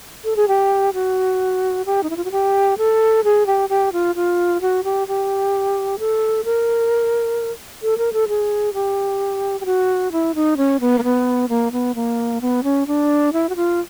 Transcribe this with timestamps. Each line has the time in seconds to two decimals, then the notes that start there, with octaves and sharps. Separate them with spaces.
0.24 A4
0.36 G#4
0.48 G4
0.94 F#4
1.86 G4
2.03 D#4
2.10 E4
2.17 F4
2.25 F#4
2.32 G4
2.78 A4
3.24 G#4
3.47 G4
3.69 G4
3.93 F4
4.16 F4
4.61 F#4
4.84 G4
5.08 G4
5.99 A4
6.45 A#4
7.83 A4
7.98 A#4
8.13 A4
8.28 G#4
8.74 G4
9.61 G4
9.66 F#4
10.12 E4
10.35 D#4
10.57 C#4
10.81 B3
10.99 A#3
11.04 B3
11.49 A#3
11.72 B3
11.95 A#3
12.41 B3
12.64 C#4
12.87 D4
13.33 E4
13.49 F#4
13.56 F4